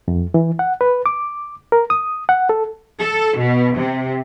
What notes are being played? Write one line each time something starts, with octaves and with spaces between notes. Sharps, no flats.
F2
E3
F#5
B4
D6
A#4
D#6
F#5
A4
A4
B2
C3